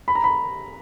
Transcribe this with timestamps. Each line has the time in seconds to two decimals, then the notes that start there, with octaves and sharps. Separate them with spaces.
0.08 B5
0.15 A#5
0.24 B5